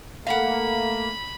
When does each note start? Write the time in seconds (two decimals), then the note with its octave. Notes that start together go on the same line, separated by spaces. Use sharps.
0.27 A3 A#3 A4 F5 F#5 B5